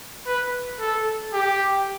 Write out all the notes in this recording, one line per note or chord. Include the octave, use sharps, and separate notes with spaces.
B4
A4
G4